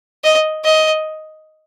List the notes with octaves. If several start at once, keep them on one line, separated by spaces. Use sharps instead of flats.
D#5
D#5